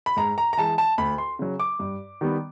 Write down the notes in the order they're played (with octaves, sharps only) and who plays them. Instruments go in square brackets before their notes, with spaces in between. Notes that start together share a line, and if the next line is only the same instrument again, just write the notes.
[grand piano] B5
G#2 A#5
A#5
A#5
E3 G#3 A5
A5
D2 B5
C6
C#3 F#3
D6
G2
D#3 G3 B3